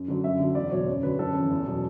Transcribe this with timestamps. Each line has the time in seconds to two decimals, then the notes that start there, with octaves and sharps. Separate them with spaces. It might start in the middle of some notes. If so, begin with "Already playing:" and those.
Already playing: F#2
0.08 D3 F#3
0.24 F#2 E5
0.40 D3 F#3
0.55 E2 D5
0.71 B2 F#3 C#5
0.87 F#2 C#5
1.03 D3 F#3 B4
1.19 F#2 A4
1.34 C#3
1.39 E3
1.50 E2
1.67 B2 F#3